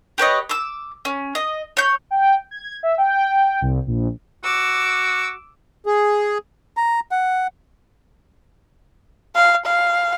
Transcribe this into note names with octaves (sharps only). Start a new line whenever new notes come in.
G4 B4 C#5 D#5
D6 E6
C#4
D#5
C#5 G6
G5
G#6
E5
G5
C2
A#1
F#4 D6 E6
G#4
A#5
F#5
F5
F5